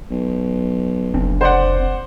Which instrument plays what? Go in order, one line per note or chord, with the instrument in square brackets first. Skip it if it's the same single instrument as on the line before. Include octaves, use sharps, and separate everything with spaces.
[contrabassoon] B1
[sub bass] F1 [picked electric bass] C#2 C4 D4
[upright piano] C5 D5 F#5